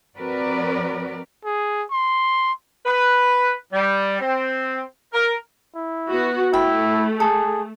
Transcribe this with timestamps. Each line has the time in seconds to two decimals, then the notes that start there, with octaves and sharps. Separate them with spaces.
0.17 F3 C4 F#4 A#4 B4 D5
1.45 G#4
1.91 C6
2.86 B4
3.73 G3
4.20 C4
5.13 A#4
5.75 E4
6.10 B3 F#4
6.53 A3 E4 G5 B5
7.20 G#4 A4